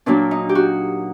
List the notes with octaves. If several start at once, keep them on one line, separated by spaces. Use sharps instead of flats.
A#2 F#3 A#3 D4
D#4
G4
F#4